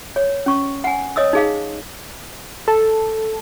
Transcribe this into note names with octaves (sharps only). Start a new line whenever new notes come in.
C#5
C#4 C#6
F#5 G#5
C#5 D#5 D#6 E6
D#4 G#4 F5
A4